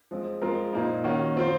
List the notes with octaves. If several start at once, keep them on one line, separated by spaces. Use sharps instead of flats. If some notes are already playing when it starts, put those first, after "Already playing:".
F3 G#3 C4
F3 G#3 C4 F4 A#4
A#2 F3 A#3 D#4
D#3 A#3 C#4 F#4
F3 C4 F4 C5